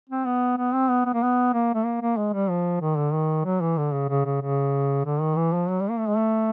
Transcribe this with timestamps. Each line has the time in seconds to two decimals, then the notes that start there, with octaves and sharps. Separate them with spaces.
0.10 C4
0.25 B3
0.57 B3
0.74 C4
0.90 B3
1.05 B3
1.14 A#3
1.23 B3
1.53 A#3
1.74 A3
1.85 A#3
2.01 A#3
2.17 G#3
2.33 G3
2.50 F3
2.81 D#3
2.97 D3
3.13 D#3
3.45 F#3
3.61 E3
3.77 D3
3.93 C#3
4.09 C#3
4.25 C#3
4.42 C#3
5.05 D3
5.21 D#3
5.37 E3
5.53 F3
5.69 F#3
5.80 G3
5.90 A#3
5.99 A3
6.08 G#3
6.17 A3